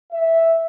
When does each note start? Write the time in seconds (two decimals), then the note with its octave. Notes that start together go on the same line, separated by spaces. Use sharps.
0.12 E5